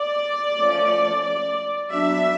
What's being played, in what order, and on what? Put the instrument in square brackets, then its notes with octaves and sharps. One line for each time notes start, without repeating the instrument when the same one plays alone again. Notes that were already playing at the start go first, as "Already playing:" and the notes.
Already playing: [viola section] D5
F3 A3 C#4
D5
F#3 B3 D4 E5